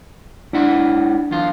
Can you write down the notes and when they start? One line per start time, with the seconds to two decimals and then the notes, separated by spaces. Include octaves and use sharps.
0.53 G#2 D4 E4 F#5
1.31 E2 F4